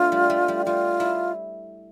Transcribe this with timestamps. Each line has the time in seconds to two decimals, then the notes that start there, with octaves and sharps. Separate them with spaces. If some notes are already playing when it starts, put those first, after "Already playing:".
Already playing: A3 B3 D4 E4 F4
0.12 G3
0.30 A3
0.48 G3
0.66 G3 F4
1.00 E4